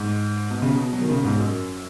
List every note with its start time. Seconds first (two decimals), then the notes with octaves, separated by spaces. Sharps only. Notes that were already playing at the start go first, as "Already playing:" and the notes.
Already playing: G#2
0.50 B2
0.62 C#3
0.74 B2
0.93 F#3
1.01 D#3
1.10 C#3
1.20 B2
1.24 G#2
1.39 F#2